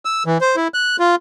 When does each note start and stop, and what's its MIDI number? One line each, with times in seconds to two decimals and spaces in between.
0.05 0.23 88
0.26 0.38 52
0.41 0.56 72
0.56 0.68 64
0.74 0.97 90
0.99 1.16 65